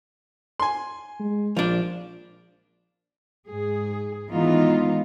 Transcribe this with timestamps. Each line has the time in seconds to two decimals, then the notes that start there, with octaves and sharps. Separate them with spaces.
0.60 G#5 C6
1.20 G#3
1.57 A#1 F3 D4
3.47 G#2 G#4
4.30 D#3 E3 G#3 B3 D#4 F4